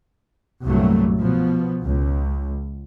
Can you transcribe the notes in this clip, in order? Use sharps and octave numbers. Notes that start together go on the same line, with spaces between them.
C2 G2 A#2 F#3 G3 A3
B2 F3 B3
C#2